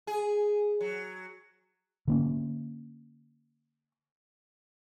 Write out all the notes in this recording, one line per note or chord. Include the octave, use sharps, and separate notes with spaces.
G#4
F#3
D3 A#3 C#4